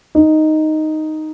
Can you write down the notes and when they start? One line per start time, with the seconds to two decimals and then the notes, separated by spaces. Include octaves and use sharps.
0.15 D#4